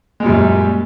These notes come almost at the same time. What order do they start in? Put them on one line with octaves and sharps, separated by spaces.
G#3 A#2 G3 F#2